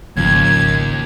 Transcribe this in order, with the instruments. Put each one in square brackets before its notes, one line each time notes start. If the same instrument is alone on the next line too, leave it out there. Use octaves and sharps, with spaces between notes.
[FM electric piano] G#1 C#3 F3 [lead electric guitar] D#2 [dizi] G#6